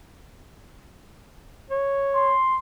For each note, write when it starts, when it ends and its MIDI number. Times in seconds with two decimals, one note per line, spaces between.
1.70 2.33 73
2.15 2.58 84